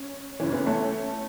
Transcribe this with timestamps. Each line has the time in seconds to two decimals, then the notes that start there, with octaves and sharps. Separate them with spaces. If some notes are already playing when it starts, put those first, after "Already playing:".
Already playing: C#4
0.40 F#2 C#3 E3 C#4
0.53 B3
0.66 A3 C#4